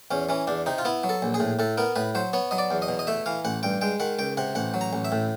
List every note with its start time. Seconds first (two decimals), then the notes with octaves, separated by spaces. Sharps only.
0.11 E2 C#4
0.29 E3 C#4
0.47 E2 D4
0.66 C3 D#4
0.78 F4
0.85 B3 E4
1.04 F#3
1.09 A4
1.22 A#1
1.34 G#4
1.40 A2
1.59 A2 A4
1.78 B3 A#4
1.96 A2 B4
2.15 F#3 C5
2.33 B3 C#5
2.51 F#3 D#5
2.58 D5
2.71 E2
2.82 D#5
2.88 B2
2.99 D#5
3.07 A3 E5
3.26 E3 F5
3.45 A1 F#5
3.63 G2 G5
3.81 G#3 G5
4.00 D#3 F#5
4.19 C#2 G5
4.37 C3 F#5
4.55 A1 F#5
4.74 F#3
4.81 A#5
4.93 A1
5.05 E5
5.12 A2